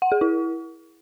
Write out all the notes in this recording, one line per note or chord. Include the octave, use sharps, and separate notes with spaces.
F#5
G#4
E4